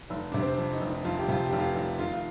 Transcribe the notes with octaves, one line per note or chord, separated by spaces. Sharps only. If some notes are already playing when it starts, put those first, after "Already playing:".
F1
C3 D4
C4
F2
D#4
F1
F2 F4
G4
C3 F4
G4
F1
F4
F1
D#3 F4
F4